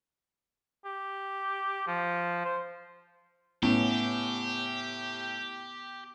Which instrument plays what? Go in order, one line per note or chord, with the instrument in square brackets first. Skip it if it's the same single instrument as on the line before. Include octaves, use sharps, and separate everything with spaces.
[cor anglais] G4
F3
C5
[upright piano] A2 [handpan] B3 C#4 [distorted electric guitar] G4